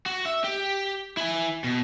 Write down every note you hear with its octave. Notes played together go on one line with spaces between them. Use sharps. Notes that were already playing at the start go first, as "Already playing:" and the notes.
F#4
E5
G4
E4 G#5
B2